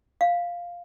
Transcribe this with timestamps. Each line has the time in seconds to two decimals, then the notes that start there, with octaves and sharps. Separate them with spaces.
0.21 F5